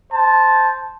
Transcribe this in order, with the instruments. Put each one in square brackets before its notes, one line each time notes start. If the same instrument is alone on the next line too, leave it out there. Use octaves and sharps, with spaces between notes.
[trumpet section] C5 A5